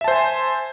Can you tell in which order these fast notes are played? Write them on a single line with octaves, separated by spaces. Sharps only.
E5 A5 C5 G#5